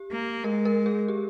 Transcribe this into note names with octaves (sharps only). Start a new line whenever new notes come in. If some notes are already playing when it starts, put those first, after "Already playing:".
Already playing: G4
A#3
G#3 A#4
A#4
G#4
G4